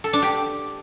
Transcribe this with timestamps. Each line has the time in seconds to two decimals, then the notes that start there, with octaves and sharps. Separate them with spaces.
0.04 A4
0.13 D4
0.22 G4